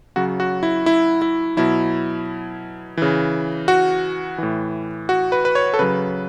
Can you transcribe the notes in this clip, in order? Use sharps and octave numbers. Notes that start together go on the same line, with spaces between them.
C#3 F#3 F#4
F#4
E4
E4
E4
B2 F#3 E4
C#3 E3
F#4
A2 E3
F#4
B4
B4
C#5
A4
C#3 F#3 B4